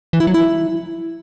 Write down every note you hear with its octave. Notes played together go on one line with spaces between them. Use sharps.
E3
E4
F#3
E4